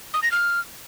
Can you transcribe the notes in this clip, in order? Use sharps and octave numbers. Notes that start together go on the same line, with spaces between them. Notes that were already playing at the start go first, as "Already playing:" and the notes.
D#6
A#6
F6